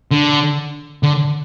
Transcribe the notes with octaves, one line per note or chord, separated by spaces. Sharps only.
D3
D3